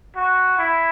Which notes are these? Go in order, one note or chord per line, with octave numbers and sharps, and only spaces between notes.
F#4
E4